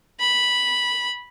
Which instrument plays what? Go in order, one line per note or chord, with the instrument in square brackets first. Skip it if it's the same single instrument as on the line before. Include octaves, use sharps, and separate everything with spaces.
[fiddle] B5